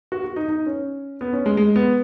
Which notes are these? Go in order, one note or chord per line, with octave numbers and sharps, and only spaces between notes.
F#4
F#4
D#4
D#4
C#4
B3
C#4
G#3
G#3
B3